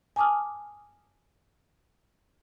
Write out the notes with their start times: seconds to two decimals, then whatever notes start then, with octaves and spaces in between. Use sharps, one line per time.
0.16 G#5 A5 D6 D#6 F6